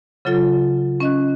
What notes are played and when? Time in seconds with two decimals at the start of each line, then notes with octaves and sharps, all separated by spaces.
0.25 C#3 F#3 F4 A4
1.00 C#4 D#5 F#6